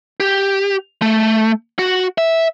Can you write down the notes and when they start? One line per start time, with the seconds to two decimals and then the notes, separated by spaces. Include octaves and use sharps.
0.20 G4
1.02 A3
1.79 F#4
2.18 E5